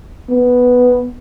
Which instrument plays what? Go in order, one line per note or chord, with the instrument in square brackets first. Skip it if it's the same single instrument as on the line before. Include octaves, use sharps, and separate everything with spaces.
[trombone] B3